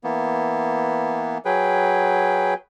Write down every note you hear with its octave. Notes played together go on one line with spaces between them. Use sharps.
E3 A#3 B3
F#3 G#4 B4 G5